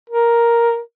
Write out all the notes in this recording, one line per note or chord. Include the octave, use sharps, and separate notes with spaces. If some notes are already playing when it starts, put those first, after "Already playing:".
A#4